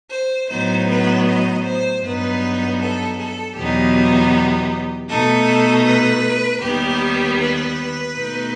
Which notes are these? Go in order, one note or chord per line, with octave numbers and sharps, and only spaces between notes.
C5
A2 F#3 B3 D#4 C5
B4
D#5
C5
G2 F#3 B3 D#4 B4
A4
A4
E2 B2 F#3 B3 D#4 G4
B2 A3 D#4 A4
B4
D#2 D#3 G3 B3 G4
B4
B2 A3 D#4